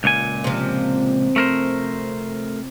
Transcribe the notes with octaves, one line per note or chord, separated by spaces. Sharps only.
C#2 A#2 G#5
C3 F3
A3 A#4 C5